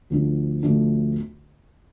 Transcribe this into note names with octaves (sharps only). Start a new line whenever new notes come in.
D2 D3 F3 A3 D4
D2 D3 F3 A3 D4